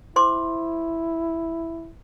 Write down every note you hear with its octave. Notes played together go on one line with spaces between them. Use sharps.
E4 C5 C6 D6